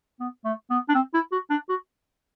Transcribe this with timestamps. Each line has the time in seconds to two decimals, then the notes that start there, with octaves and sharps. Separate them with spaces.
0.20 B3
0.45 A3
0.70 B3
0.89 D4
0.95 C4
1.14 E4
1.32 F#4
1.50 D4
1.69 F#4